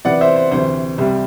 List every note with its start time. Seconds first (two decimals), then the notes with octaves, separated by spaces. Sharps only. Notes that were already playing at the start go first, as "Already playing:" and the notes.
0.05 C3 E3 B3 E4 D5 F#5
0.21 C5 E5
0.36 C5
0.51 D2 C3 E3 C5
0.98 C2 C3 G3